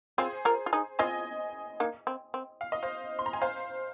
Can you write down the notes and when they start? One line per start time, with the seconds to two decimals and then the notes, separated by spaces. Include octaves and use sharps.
0.18 C4 F4 G#4 C5
0.45 F4 A#4
0.66 F4
0.73 D#4 G#4
0.99 C4 F4 D#5 G#5
1.80 A#3 D#4
2.07 C4
2.34 C4
2.61 F5
2.72 D#5
2.83 C5 F5
3.19 C6
3.26 A#5
3.33 G#5
3.42 C5 F5